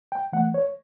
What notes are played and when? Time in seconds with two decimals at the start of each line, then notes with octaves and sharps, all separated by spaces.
0.12 G5
0.33 E3 A3 F#5
0.54 C#5